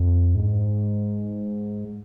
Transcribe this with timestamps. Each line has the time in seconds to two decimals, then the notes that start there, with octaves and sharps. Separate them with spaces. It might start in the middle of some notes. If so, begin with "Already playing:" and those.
Already playing: F2
0.35 G#2